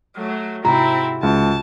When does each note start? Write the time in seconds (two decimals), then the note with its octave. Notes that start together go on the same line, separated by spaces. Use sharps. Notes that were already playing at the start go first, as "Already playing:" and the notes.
0.16 F#3 A3
0.65 G#2 C3 C4 E4 F#4 A#5
1.23 C#2 A5